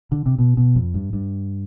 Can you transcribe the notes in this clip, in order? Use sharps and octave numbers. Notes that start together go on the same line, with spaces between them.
D3
C3
B2
B2
F2
G2
G2